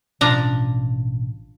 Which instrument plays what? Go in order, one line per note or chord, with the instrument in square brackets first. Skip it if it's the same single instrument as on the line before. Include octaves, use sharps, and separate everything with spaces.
[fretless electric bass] A1 B2 C#4 [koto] F3 D4 A#5